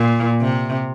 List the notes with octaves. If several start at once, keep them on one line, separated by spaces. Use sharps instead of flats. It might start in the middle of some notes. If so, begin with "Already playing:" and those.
Already playing: A#2
C3